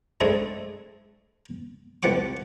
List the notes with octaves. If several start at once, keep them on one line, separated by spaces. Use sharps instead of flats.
G#3 A3 C4 D4 E4 G#4
C2 E3 F3 F#5 G5 D6